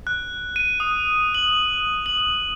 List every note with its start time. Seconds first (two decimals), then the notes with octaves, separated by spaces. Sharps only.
0.07 F#6
0.56 D#7
0.80 D#6
1.35 F#7
2.06 F#7